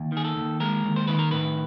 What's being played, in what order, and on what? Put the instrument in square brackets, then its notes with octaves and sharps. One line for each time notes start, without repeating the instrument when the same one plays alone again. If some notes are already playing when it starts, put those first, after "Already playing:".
Already playing: [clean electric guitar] D#2
D#3 G#4
A4
D#2
G#3 A#4
D#2
C5
D#3 B4
A#4
A2 B4